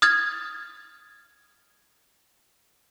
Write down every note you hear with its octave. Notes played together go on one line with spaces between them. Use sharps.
D#6 F6 G#6 A6